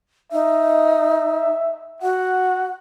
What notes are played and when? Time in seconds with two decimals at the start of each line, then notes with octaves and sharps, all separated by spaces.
0.32 D#4 E5
2.02 F#4 F#5